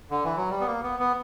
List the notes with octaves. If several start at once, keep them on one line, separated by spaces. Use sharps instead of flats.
D3
E3
F#3
G3
B3
A#3
B3
B3